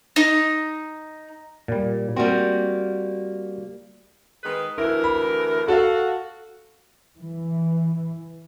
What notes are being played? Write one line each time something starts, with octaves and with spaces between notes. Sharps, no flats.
D#4
A#2 G3
G3 A#3 C4 F#4
D#3 G#3 B4
D2 E3 E4 A#4
B5
F#4 A4 F5
E3